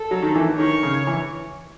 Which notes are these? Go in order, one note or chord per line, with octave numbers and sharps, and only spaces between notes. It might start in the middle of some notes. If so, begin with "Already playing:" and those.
Already playing: A4
F#3
D#3
E3
D#3 C#5
C#3
E3